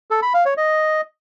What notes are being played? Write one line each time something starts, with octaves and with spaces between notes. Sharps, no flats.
A4
B5
F5
C#5
D#5